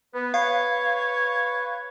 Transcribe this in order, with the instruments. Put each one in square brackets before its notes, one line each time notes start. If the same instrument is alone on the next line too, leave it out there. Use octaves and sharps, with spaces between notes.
[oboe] B3 [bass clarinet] B4
[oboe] C#5 [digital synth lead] F5